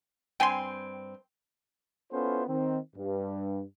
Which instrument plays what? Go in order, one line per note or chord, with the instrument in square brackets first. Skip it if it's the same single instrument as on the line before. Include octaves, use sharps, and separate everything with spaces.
[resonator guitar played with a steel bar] G2 C4 G#5 [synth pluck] G5 C6
[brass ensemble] B3 C#4 E4 F4 A4 C5
D#3 C4
G2